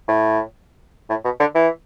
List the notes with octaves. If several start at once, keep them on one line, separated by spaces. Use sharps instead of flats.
A2
A2
B2
D3
E3